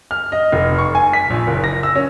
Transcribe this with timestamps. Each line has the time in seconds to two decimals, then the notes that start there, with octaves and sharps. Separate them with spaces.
0.11 F6
0.32 D#5
0.52 F1
0.79 C#6
0.95 G#5
1.13 B6
1.30 A#1
1.47 F#1
1.64 A#6
1.83 E6
1.95 C#4